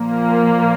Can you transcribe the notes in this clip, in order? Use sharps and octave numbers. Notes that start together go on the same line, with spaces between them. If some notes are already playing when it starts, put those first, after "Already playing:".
Already playing: A#2 F3 A#3